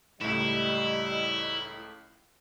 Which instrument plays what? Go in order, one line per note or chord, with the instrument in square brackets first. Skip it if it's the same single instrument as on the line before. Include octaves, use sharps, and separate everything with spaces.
[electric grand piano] C#2 A2 [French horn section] G3 D#5 [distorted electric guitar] E4